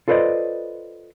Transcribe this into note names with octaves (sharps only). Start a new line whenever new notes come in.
F4 A4 B4 C5 D5 D#5